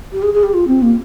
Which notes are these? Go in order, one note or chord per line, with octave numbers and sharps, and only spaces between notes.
G4
G#4
G#4
G4
F4
C4
A#3